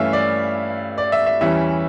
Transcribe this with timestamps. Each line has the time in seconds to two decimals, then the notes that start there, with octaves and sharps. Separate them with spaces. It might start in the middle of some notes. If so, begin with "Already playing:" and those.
Already playing: G2 E3 A3 C#4 E5 F5
0.13 D5
0.98 D5
1.12 E5
1.26 E5
1.41 E2 E3 G3 C#4 E5